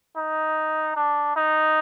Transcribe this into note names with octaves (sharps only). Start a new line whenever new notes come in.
D#4
D4
D#4